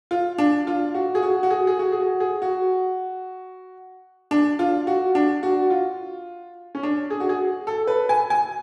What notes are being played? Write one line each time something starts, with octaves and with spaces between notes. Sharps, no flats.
F4
D4
F4
F#4
G#4
F#4
F#4
G#4
G#4
F#4
G#4
F#4
G#4
F#4
D4
F4
F#4
D4
F#4
F4
C#4
D4
G#4
F#4
G#4
A4
B4
G#5
G#5